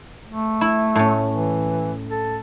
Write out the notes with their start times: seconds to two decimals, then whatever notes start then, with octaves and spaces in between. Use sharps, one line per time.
0.28 A3
0.61 E4
0.95 A2 C#4
1.31 E3
2.11 A4